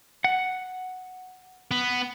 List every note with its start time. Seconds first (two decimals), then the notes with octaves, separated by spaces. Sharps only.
0.24 F#5
1.71 B3